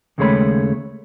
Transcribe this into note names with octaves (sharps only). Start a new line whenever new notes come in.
D#2 C#3 G#3 A3 C#5 B5